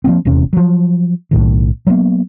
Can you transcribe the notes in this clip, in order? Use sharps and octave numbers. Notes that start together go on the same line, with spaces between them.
F3 G3 A#3 C4
D#1 E2 C3 C#4
F3 F#3
B1 A2 D#3
F#3 G#3 A#3 B3